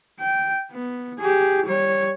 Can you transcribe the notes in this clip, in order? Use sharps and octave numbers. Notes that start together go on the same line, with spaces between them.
G5
B3
G4 G#4
G3 C#5